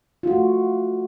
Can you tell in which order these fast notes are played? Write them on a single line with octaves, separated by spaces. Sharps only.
F4 F#4 A3